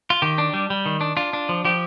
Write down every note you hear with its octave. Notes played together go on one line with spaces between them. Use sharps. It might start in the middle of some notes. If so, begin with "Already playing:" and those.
F4
D#3 G4
D4
G3
G3
D#3
D4
D4 F4
D4
F3
F3 G4